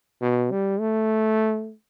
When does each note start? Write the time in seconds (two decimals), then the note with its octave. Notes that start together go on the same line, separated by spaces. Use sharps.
0.22 B2
0.51 G3
0.80 A3